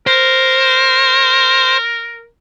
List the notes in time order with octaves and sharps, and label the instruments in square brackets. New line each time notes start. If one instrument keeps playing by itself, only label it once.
[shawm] A#4 [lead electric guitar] C5